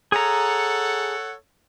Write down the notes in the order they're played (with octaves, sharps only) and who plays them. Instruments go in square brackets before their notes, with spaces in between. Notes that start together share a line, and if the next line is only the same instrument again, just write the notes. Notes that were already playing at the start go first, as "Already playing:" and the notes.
[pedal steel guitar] G#4 A#5 [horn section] A4 C#5 F#5